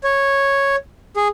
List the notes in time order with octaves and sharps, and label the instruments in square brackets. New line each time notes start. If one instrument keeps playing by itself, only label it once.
[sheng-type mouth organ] C#5
G#4